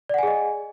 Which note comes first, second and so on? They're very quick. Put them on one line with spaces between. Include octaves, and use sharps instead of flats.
D5 F#5 G#5 G#4 D#5